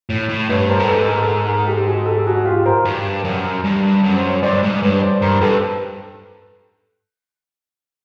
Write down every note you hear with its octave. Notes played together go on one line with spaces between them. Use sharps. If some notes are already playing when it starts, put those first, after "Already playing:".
A2
A2
G2 B4 C#5
A#4 C5
A2 A#4
G#2 A4 B4
G#4 A#4
A4
G#4 A#4
G#4 A#4
G4 A4
F#4 G#4
G4 A4
F#4 G#4
F4 G4
A#4 C5
G2
F#2
G2
F#2
C5
C#5
G2 C5 D5
G#2
G2 B4 C#5
C5 D5
G2 A#4 C5
G2 A4 B4